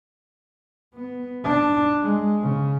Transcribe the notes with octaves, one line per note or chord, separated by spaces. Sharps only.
B3
D4
G#3
C#3